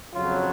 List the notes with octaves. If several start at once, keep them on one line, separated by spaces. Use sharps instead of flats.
F2 C#3 F#3 F4